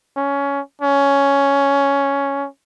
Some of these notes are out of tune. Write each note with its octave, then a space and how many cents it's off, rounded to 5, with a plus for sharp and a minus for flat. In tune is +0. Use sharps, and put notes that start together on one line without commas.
C#4 +15
C#4 +5